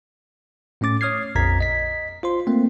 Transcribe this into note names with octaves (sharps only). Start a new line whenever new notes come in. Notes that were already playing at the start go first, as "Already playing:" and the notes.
A2 A3 C#4 D6 A6
C#5 D#6 F6 G#6 C7
A#1 F2 A#5 G#6 B6
D#5 B6
F4 C5 C6
A3 A#3 C4